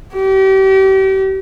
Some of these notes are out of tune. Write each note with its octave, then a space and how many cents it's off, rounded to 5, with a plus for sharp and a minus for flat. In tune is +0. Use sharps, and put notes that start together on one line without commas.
G4 -35